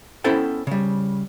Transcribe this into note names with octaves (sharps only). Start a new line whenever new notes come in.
B3 C#4 E4 A4 C5 G5
C#3 G3